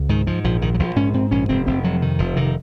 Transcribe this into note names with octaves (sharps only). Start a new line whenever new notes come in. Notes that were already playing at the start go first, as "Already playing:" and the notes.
Already playing: C#2
G#2 D#3
G#2 F3
A#1 F3
A#1 D#3
F#3
A#1 F3
G#2 C#4
G#2 C4
A#1 C#4
F1 C4
F1 C4
F2 F#3
C3 D#3
F1 F3
C3 D#3